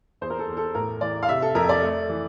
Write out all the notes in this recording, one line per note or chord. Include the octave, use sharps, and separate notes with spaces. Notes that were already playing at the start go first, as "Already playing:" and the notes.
E2 C5
A#4
A4
E2
A4
A2 A#4
E3 D5
F5
C3 E5
A4
F2 A#4
D5
A3
E3